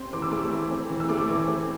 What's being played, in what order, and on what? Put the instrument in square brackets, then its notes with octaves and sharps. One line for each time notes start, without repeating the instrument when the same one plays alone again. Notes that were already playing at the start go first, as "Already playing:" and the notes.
Already playing: [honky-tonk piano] C4 C6
E3 D6
E6
A3 D6
E3
C4
E3
E6
A3 D6
E3
C4